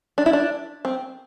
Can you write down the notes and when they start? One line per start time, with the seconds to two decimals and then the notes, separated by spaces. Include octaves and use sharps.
0.18 D4
0.26 E4
0.33 D4
0.85 C4